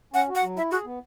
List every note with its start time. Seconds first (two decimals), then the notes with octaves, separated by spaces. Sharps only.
0.14 C#4 F#5
0.29 F#4
0.35 F#5
0.43 F#3
0.57 E4 E5
0.71 F#4 G#4
0.85 B3